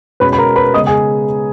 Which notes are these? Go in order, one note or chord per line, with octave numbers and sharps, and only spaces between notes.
B2 G#3 C#4 B4 B5
B5
A#4 A#5
B4 B5
C#3 G#3 B3 D#5 D#6
G#4 G#5